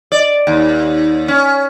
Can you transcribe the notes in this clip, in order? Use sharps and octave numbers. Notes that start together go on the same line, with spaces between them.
D5
D#2
C#4